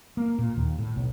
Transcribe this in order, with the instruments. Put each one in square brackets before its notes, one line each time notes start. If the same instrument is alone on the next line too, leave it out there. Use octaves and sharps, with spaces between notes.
[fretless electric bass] A#3
A#2
D#2
A2
B1